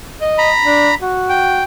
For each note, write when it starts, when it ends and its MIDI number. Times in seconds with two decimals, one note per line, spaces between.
0.21 0.49 75
0.38 0.95 82
0.38 0.95 83
0.63 0.91 62
1.01 1.63 66
1.29 1.64 79